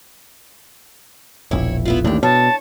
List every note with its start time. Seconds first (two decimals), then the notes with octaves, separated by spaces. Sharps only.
1.51 E1 A#1 E4 C#5
1.85 B3 E4 F4
2.04 A1 D#2 A2 D4 G4
2.23 B2 C#5 A5